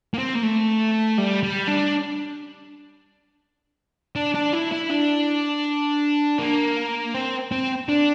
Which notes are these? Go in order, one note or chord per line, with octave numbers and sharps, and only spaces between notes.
A#3
C4
A#3
A3
G3
G3
D4
D4
D4
E4
E4
D4
A#3
C4
C4
D4